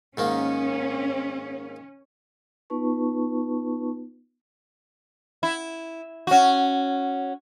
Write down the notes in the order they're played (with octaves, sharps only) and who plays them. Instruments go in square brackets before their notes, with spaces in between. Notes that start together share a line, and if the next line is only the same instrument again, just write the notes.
[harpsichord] G#2 D#3 A#3 [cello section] C#4
[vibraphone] B3 D#4 F4 B4 A5 C#6
[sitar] E4
C#4 F#4